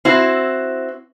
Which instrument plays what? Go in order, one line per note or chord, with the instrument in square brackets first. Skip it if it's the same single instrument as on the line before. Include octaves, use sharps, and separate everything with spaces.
[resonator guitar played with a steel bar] C4 E4 F#4